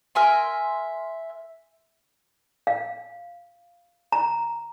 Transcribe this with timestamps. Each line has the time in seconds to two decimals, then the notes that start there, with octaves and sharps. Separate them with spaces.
0.15 A#4 E5 G#5 C6
2.67 F5
4.12 A#5